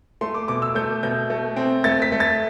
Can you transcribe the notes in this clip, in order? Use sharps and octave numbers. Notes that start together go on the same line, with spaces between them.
A3 C6
D6
B2 D6
E6
A3 G6
B2 G6
A3
C4
A3 A6
B6
A3
A6